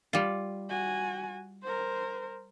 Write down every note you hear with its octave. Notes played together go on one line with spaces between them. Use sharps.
G3 F4
F#4 G#5
A#4 C5